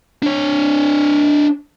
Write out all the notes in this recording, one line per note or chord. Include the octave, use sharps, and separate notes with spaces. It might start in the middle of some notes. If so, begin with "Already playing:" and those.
D4 C#5